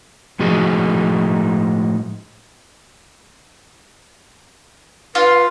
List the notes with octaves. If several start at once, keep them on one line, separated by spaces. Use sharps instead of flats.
A2 F3 G#3 D#4 F#4 G#4
F4 B4